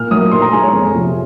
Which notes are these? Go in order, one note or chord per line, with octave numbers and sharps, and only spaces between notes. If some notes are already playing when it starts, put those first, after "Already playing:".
Already playing: A#2 F6
F#3 A#3 D#6
A#2 C6
A#5
G#3 G#5
C#5
F2
C3 F3